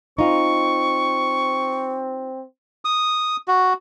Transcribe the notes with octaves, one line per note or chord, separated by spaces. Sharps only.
C4 D#4 F4 C#6
D#6
F#4